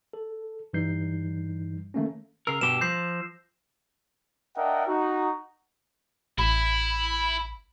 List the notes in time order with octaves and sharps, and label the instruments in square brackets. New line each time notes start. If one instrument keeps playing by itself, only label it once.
[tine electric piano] A4
G2 E3 G3 D#4 G6 C7
D#3 A3 A#3 C#4
[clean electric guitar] C#3 A#4 [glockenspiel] E6 C7
[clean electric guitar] G2 B2 G4 [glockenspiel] E7
[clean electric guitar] F3 [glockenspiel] G6 A#6 C7
[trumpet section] D4 A#4 D#5 E5 F#5 G5
D#4 F#4
[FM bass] A1 [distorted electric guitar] E4 [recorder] B5